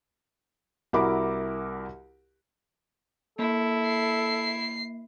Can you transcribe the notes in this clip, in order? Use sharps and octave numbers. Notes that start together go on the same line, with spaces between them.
C2 E4 F#4 A#4 B5 D6
A#3 E4 A4
C7